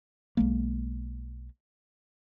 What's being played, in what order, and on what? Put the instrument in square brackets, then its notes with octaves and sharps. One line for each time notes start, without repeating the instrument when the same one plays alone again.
[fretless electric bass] B1 G#3 A#3